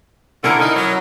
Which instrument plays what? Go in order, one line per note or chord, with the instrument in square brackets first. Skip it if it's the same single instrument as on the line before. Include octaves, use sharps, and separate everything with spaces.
[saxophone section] D3 [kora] C#4 E4 A#4
[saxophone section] D#4
F#3